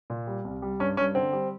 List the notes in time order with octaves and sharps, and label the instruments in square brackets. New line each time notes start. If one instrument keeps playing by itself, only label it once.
[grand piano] A#2
G3
C2
G3
G2 C#4
G2 C#4
D3 C4
G3